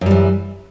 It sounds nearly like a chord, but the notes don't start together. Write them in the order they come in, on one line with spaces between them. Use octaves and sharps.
F#2 G3 E3